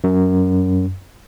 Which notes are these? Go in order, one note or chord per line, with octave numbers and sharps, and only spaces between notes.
F#2